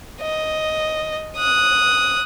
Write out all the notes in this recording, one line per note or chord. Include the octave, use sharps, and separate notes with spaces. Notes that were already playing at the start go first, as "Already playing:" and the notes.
D#5
D#6 F#6